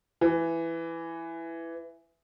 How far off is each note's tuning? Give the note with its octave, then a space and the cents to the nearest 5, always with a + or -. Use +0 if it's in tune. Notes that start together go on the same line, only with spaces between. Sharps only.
E3 +10